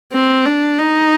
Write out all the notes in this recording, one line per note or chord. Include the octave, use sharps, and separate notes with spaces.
C4
D4
D#4